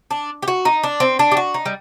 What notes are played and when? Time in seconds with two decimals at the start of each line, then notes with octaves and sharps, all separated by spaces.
0.11 D4
0.42 G4
0.48 F#4
0.65 D#4
0.83 D4
1.00 C4
1.19 D4
1.31 G4
1.37 F#4
1.54 D#4
1.66 G3